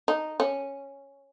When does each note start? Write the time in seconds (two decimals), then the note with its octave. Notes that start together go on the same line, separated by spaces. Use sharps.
0.08 D#4
0.40 C#4